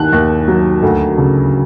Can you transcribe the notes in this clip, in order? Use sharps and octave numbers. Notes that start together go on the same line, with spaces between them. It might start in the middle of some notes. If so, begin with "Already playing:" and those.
Already playing: D#2 D#3 F#6
D#2
F#3
D2
C#3